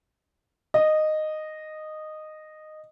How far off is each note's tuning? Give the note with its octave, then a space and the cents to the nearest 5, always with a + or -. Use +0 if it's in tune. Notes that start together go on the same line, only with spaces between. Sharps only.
D#5 -10